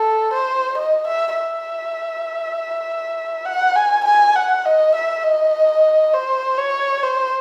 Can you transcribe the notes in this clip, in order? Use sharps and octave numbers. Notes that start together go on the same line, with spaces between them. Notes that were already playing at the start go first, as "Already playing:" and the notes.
Already playing: A4
C5
D#5
E5
E5
F#5
G#5
G#5
F#5
D#5
E5
D#5
C5
C#5
C5